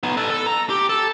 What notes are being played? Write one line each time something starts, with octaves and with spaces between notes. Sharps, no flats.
B3 D#4
A4 B4
A4
A#5
G4
A4